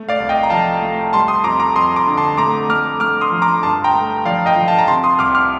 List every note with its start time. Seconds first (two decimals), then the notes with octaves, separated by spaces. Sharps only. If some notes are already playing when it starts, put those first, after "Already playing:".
Already playing: A3
0.09 D5 F5
0.20 C2
0.29 D#5 G5
0.43 A#5
0.50 F3 F5 A5
0.82 A3
1.13 G3 A5 C6
1.28 C6 D#6
1.44 F2 A#5 D6
1.59 A#5 D6
1.76 F2 C6 D#6
1.96 A#5 D6
2.07 D3
2.18 A5 C6
2.37 A3 A#5 D6
2.69 A3 D6 F6
3.00 A3 D6 F6
3.21 C6 D#6
3.32 F3
3.42 A#5 D6
3.63 G2 A5 C6
3.84 G5 A#5
3.94 A3
4.25 F3 D5 F5
4.46 D#5 G5
4.56 F3
4.68 F5 A5
4.79 A#5
4.88 C3 A5 C6
5.04 C6 D#6
5.19 C2 D6 F6
5.35 D6 F6